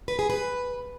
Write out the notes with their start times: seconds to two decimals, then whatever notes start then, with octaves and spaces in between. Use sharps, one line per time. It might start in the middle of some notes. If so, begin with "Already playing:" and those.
0.08 B4
0.19 G#4
0.30 B4